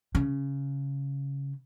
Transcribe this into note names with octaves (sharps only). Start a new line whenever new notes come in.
C#3